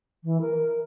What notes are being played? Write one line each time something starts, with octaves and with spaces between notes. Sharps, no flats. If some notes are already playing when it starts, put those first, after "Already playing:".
E3
A#4